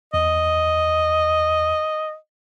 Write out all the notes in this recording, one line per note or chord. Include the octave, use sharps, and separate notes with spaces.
E2 D#5